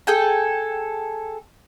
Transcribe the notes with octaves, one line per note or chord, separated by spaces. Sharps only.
G#4 A4 G5 G#5